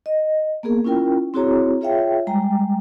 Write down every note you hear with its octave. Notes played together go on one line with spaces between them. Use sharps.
D#5
A#3 B3 G#4 A#4
C#4 E4 F4 A#4 G5
C4 E4 F#4 G#4 C#5 A#5
F4 G#4 C#5 E5 F5 G5
G3 G#3 G5 A#5